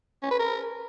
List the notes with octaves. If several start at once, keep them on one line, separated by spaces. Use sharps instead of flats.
C#4
B4
A#4